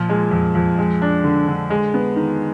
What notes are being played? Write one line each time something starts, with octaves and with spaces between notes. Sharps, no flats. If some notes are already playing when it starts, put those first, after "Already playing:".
Already playing: A#2 F3
G#3
F2
F2
G#3
D4
D3
D3
G#3
B3
D#3